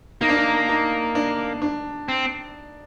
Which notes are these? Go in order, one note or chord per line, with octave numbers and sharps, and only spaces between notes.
A#3 D#4
D4
D#4
D#4
D4
D4
C4